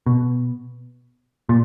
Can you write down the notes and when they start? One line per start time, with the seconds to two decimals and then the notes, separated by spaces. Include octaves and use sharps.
0.06 B2
1.49 A#2